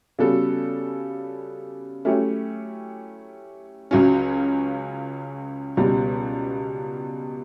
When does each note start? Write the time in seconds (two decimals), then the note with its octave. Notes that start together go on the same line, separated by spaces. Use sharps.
0.19 C#3 G3 B3 F#4 A4
2.05 F#3 A3 C#4 E4 G4
3.91 C#2 C#3 F#3 C#4
5.77 C#2 B2 G3